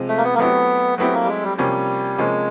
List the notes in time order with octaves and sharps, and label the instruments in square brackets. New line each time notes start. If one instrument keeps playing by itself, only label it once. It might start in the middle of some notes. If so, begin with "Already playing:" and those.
Already playing: [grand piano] C3 F3 G#3 C4
[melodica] A3
A#3
B3
A#3
[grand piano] F#3 A3 C4 E4 G4 [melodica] B3
[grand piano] F#3 A3 C4 E4 G4 [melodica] B3
[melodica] A#3
G3
G#3
G3
[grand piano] C3 F3 A#3 C#4 [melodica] G3
[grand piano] C3 F3 A#3 C#4 [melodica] G#3